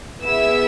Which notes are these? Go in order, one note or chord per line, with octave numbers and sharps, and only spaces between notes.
B3 E4 G#4 E5 E6